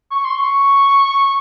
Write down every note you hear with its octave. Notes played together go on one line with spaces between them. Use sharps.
C#6
C6
C#6